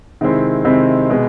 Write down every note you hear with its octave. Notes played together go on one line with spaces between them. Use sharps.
C3 D#3 G#3 C4 E4
C3 D#3 G#3 C4 E4
B2 G#3